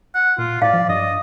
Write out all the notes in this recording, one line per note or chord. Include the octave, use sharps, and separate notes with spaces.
F#5
A#2 F4
A2 D5 F5
F3
G2 D#5